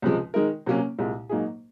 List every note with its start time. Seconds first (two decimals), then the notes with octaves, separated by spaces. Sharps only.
0.02 C#2 C3 F3 G#3
0.34 D#3 G#3 D#4 A#4
0.66 C3 F#3 A#3 C#4
0.98 C2 A#2 G#3
1.29 G#2 F#3 A#3 D#4 G#4